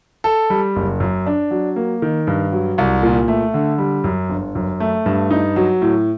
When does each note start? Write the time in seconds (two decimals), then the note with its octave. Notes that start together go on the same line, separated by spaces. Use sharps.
0.24 A4
0.50 G3
0.76 F#1
1.00 F#2
1.26 D4
1.51 F#3
1.76 A#3
2.02 D#3
2.27 G2
2.52 F#3
2.78 C2
3.03 A#2
3.28 A3
3.54 D3
3.78 G3
4.04 F#2
4.30 G1
4.55 F#2
4.80 A3
5.06 G2
5.31 D#4
5.56 F#3
5.82 A2